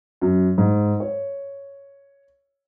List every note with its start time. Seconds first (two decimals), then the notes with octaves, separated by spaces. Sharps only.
0.21 F#2
0.58 G#2
1.00 C#5